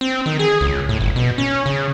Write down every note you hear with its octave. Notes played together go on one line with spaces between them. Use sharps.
C4
D#3
G#4
C#2
A2
G1
B2
C#4
C#3